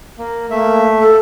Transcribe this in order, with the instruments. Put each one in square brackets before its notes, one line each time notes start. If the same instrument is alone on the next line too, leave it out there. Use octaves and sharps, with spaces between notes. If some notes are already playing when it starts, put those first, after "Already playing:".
[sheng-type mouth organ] A#3
[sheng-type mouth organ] A3 E5 [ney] A#3
[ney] A4